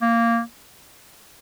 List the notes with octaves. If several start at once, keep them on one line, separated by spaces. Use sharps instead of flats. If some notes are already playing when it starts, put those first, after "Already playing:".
A#3